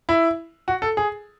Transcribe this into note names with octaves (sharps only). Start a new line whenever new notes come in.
E4
F#4
A4
G#4